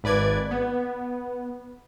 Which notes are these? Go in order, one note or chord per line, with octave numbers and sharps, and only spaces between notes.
G#1 B4 D5 G#6
B3